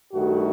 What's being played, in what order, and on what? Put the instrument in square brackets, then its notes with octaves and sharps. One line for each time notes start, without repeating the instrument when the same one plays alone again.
[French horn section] G2 D#3 A3 F#4